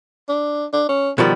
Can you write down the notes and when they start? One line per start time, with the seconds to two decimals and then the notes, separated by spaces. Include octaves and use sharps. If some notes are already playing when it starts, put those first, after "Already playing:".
0.29 D4
0.73 D4
0.89 C#4
1.18 B2 D#3 F3 G3